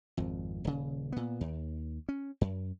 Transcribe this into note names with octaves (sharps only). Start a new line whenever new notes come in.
G#1 F2
D#1 C#3
A#2 B3
D#2
C#4
F#2